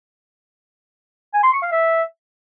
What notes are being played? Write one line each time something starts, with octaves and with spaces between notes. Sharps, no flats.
G#5
C6
C#6
F5
E5